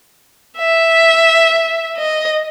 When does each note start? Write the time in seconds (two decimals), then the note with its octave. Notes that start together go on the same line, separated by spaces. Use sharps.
0.58 E5
1.97 D#5